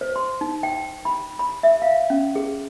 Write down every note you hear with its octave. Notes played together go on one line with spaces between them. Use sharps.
C5
C6
D#4
G5
B5
B5
E5
F5
C#4
G#4